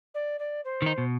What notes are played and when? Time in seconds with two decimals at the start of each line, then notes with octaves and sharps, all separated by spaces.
0.14 D5
0.39 D5
0.64 C5
0.82 D#3 D#4
0.98 B2